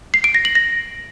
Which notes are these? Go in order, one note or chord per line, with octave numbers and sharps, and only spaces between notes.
C7
D7
A#6
F#7
A#6